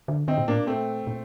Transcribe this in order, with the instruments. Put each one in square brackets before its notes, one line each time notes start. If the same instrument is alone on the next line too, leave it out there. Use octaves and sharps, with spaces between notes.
[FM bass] D3
[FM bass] D3 [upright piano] C4 D#4
[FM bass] A#2
[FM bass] A2 [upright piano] A#3 D4
[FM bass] A#2
[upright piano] A3 C4
[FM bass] A#2